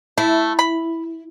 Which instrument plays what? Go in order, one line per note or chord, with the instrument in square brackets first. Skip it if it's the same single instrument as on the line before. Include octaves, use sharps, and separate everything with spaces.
[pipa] A3 [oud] E4
[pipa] B5